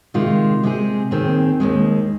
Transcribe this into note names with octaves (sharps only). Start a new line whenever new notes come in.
C3 D#3 G#3 F4
C3 G#3 C4 G#4
D#2 D#3 C4 G#4
D#2 D#3 G#3